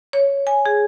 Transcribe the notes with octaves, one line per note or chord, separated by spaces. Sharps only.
C#5
G#5
G#4